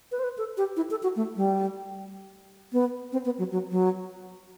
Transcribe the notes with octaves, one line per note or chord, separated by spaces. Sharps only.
B4
C5
B4
A4
G4
E4
A4
F#4
A3
G3
B3
C4
B3
F#3
F#3
F#3